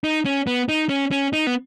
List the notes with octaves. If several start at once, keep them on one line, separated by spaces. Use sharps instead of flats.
D#4
C#4
B3
D#4
C#4
C#4
D#4
B3